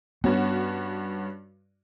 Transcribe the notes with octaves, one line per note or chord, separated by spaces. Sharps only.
G2 B3 C#4 F#4